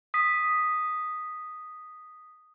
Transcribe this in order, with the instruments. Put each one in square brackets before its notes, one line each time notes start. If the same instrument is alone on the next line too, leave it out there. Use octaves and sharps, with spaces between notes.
[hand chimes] D#6 B6